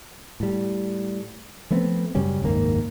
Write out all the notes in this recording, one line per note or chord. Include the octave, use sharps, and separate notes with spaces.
A2 G3
F3 A3 B3 C4
F#2 C#3 G3 C#4
F#1 D#2 G#2 A#3